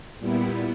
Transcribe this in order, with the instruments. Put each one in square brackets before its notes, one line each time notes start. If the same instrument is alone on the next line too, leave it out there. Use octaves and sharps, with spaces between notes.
[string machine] A#2 G3 B3 E4